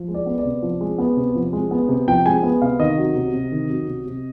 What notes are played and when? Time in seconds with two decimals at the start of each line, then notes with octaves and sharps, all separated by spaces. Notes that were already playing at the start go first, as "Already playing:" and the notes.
Already playing: F3
0.08 G#3
0.14 D5
0.26 B3
0.38 D5
0.45 C3
0.62 F3
0.81 G#3
0.98 B3
1.16 C3
1.35 F3
1.53 G#3
1.71 B3
1.89 C3
2.08 F3 G5
2.26 G#3 G#5
2.43 B3
2.62 C3 F5
2.79 D#3 D#5
2.98 F#3
3.16 C3
3.33 C3
3.52 D#3
3.70 F#3
3.88 C3
4.06 C3